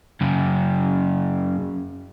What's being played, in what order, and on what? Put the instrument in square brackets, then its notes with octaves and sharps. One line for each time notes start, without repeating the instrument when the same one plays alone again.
[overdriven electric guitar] F#2 C#3